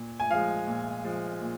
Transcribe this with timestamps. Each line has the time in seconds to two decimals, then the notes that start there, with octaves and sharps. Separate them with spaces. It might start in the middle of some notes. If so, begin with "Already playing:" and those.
Already playing: A#2
0.20 G#5
0.31 F3 G#3 F5
0.67 A#2
1.04 F3 G#3
1.42 A#2